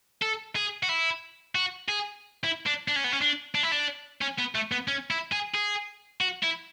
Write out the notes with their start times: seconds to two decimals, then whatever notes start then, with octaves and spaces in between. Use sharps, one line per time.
0.22 A4
0.56 G#4
0.83 F#4
0.89 E4
1.55 F#4
1.89 G#4
2.44 E4
2.66 D4
2.88 D4
2.96 C#4
3.04 B3
3.12 C#4
3.21 D4
3.55 D4
3.63 E4
3.72 D4
4.22 C#4
4.39 B3
4.55 A3
4.72 B3
4.88 C#4
5.10 E4
5.32 G#4
5.55 G#4
6.21 F#4
6.43 E4